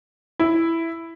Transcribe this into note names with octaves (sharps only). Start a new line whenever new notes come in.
E4